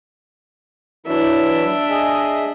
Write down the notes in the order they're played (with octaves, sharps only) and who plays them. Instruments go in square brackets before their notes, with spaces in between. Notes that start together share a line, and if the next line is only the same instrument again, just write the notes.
[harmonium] E3 F#3 E4 [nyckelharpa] D4 E5
[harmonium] G#4 D#5